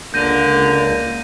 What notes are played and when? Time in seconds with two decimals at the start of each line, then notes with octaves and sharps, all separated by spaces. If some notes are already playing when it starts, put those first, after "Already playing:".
0.14 C#2 D3 A#3 G6 A#6 D#7